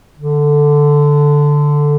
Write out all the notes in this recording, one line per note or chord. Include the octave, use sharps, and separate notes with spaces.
D3